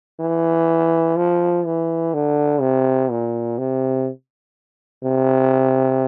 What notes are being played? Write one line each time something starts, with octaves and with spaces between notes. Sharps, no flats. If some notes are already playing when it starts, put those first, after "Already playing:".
E3
F3
E3
D3
C3
A#2
C3
C3